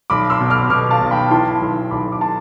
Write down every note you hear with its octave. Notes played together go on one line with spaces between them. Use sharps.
B1 B5 D6
C6 E6
B2
D6 F6
B2 D6 F6
F5 A5
B1
G5 B5
E3 A5 C6
B1
B1 B5 D6
D6
A5 C6